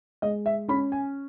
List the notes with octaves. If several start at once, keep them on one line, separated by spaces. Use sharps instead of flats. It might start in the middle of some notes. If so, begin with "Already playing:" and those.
G#3 D#5
E5
C#4 B5
G#5